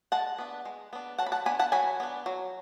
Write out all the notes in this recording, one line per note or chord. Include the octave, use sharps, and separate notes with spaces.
G#3 F#5 A5
B3 D4
G#3
B3 D4
F#3 F#5 A5
B5
F#5 A5
B3 D4 G#5 B5
F#5 A5
F#3 G#5 B5
B3 D4
F#3